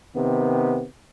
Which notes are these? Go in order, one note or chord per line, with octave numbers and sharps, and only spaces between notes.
C3 D#3 B3